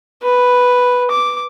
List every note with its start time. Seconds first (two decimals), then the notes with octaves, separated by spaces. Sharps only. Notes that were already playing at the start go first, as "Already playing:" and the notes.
0.23 B4
1.11 D6